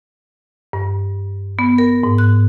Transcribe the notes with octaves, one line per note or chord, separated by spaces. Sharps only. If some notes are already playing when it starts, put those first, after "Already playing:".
G2
B3
A#4
G#2
F#6